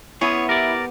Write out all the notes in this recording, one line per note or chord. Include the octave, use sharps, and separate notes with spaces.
B3 C#4 E4 G#4 C#5
G4 A#4 D5